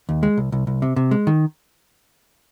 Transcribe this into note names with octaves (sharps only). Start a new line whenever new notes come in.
D#2
G#3
C2
C2
C2
C3
C3
G#3
D#3